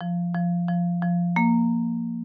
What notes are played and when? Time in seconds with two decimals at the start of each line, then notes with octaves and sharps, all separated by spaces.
0.01 F3
0.34 F3
0.68 F3
1.02 F3
1.36 A#3